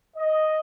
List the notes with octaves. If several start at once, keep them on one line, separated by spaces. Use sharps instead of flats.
D#5